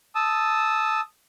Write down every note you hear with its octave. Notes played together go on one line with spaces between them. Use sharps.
A5 D#6 E6